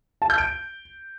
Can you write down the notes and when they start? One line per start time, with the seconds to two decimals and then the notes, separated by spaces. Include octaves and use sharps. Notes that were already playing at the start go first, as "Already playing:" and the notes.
0.22 A5
0.30 G6
0.38 D7